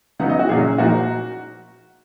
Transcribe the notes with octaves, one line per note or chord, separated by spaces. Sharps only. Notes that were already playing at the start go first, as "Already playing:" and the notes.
C#3 F#3 B3 D#4 F#5
D#5
F#4
A#2 F#3 C#4 G#4
A#2 F3 A#3 D#4 F#4